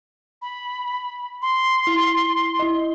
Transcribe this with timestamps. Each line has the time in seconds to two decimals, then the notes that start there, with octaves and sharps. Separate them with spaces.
0.42 B5
1.42 C6
1.87 E4
2.59 E4 D#5